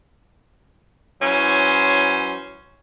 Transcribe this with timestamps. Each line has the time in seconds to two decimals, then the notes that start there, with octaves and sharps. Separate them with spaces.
1.22 E3 F#3 C#4 C5